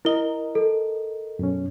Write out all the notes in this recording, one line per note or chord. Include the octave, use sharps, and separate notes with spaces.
E4 A#4 D#5 G7
A4
F#2 B2 C#4